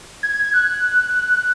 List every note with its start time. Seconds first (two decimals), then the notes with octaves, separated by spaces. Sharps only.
0.23 G#6
0.33 G#6
0.43 G#6
0.54 F#6